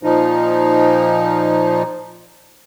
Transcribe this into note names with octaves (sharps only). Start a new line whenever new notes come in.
A#2 F3 D#4